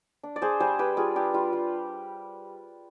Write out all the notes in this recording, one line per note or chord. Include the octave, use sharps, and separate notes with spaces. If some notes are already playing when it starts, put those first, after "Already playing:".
D4
D5
D4 G#4 C5
G3 G#4 C5
G3 G4 B4
G3 F4 G#4
D4 G4
G3 F4
G3